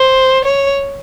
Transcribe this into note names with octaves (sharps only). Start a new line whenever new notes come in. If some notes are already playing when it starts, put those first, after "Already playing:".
Already playing: C5
C#5